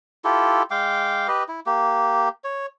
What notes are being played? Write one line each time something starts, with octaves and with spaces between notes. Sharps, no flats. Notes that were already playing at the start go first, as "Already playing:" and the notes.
E4 F4 G4 A4
G#3 F5 G5 D6
G4 B4 D#5
E4
A#3 G4
C#5